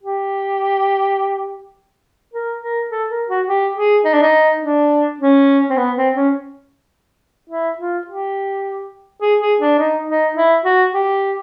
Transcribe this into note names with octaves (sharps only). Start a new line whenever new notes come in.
G4
A#4
A#4
A4
A#4
F#4
G4
G#4
D#4
D4
D#4
D4
C#4
C4
B3
C4
C#4
E4
F4
G4
G#4
G#4
D4
D#4
D#4
E4
F#4
G4